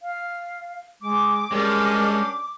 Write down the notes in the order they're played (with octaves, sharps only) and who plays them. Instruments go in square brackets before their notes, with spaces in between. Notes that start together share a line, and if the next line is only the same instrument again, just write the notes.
[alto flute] F5
[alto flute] G#3 [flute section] D6
[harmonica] G3 C#4 D4 [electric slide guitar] G#3 [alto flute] A#4